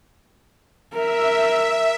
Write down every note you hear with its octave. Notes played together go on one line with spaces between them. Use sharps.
A#4 E5